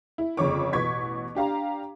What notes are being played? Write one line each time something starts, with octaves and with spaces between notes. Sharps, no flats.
E4
G1 F2 C#3 C#5 C#6 D6
A1 B2 B3 C#6 G#6 B6
D4 G4 F5 A#5